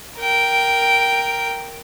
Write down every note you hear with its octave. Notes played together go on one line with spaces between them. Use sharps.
A#4 G5